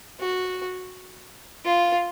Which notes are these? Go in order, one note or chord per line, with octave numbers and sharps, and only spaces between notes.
F#4
F4